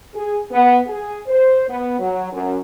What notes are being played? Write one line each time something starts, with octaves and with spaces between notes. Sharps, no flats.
G#4
B3
G#4
C5
B3
F#3
F#2